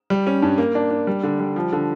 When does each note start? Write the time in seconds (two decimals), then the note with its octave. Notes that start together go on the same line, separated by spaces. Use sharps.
0.10 G3
0.27 C#4
0.42 G2
0.58 A#3
0.75 D4
0.91 D4
1.07 G3
1.23 D3
1.40 G3
1.56 F3
1.72 D3